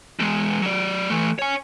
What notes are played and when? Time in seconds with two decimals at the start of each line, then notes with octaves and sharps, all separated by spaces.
0.19 E2 G#3
0.62 F#3 D5
1.10 E3 A3
1.39 C#5 G#5